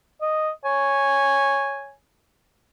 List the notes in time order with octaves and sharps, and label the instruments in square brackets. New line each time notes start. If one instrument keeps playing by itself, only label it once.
[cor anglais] D#5
[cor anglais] C#5 [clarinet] G#5